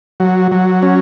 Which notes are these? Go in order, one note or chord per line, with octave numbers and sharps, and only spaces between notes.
F#3
F#3
C#4